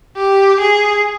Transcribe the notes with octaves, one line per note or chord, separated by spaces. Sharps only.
G4
G#4